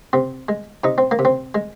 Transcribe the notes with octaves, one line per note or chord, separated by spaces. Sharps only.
C3 C4
G#3
C3 D#4
C4
A#3
C3
C4
G#3